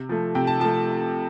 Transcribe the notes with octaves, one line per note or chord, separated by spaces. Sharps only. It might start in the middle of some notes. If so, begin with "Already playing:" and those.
Already playing: C3
F3 A3
C3 G5
A5
F3 A3 A5